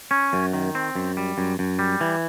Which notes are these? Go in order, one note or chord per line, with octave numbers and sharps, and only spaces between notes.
C#4
F#2
D#3
C4
F#2
G3
F#2
F#2
G3
E3